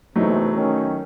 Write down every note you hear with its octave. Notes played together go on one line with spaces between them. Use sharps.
E2 C3 F#3 A3 D#4
D#3 C#4